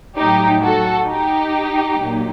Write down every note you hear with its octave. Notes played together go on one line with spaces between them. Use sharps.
A2 F#3 D#4 G4
F#4 A4
D#4 G4
A#2 F#3